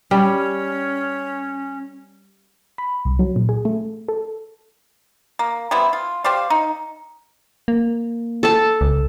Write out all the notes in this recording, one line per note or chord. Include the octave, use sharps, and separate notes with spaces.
G3 C#4
B5
C2
F#3
A#2
G#4
A3
A4
A#3
G3 B3 C4 E4
F4
G4 C5 D5 F5
D#4
A#3
A4 A5
C#2